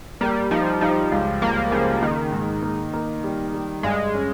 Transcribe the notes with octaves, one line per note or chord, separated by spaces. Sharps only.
G3 A#3
F3 D#4
F3 D#4
C#2
C#2 A#3
C#3 F3
D#3 A#3
G#2
A#3
A#3
G3
G3
G2 G#3
C#4